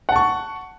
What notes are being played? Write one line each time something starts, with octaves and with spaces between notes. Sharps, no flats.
F#5 A5 C#6